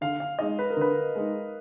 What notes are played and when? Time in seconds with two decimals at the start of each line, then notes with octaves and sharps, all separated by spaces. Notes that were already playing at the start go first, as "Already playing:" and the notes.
0.01 D3 F5
0.20 F5
0.39 G#3 D#4 D#5
0.59 B4
0.70 A#4
0.76 D3 B4
1.15 G#3 D#4